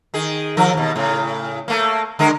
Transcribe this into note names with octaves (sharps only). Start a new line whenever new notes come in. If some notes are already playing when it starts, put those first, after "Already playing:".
D#3 G#4
D#3 F3 A#4
D#2 B2
A2 C#3
A3 A#3
D3 G#3 A#4